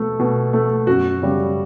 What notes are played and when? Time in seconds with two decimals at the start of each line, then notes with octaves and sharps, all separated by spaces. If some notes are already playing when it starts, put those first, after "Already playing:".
Already playing: B2 A3 A4
0.19 B2
0.53 A3
0.87 F#2 F#4
1.22 C#3 G3 B3